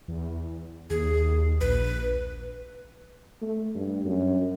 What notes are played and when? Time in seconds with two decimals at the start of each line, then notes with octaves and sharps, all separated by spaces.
0.08 E2
0.90 D#2 G#4
1.61 A#1 B4
3.42 A3
3.75 G2
4.05 F#2